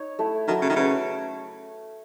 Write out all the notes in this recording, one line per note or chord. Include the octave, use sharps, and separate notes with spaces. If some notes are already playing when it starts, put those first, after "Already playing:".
Already playing: D#4 C#5
A3 E4 A4
D#3 F#3 A3 E4
C#3
D#3
C#3 E4 B4 E5